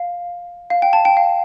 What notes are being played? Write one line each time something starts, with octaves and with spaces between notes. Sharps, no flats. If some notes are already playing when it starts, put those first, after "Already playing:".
Already playing: F5
F5
G5
A5
G5
F5